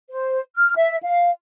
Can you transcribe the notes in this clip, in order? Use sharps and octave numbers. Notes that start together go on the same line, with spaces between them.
C5
F6
E5
F5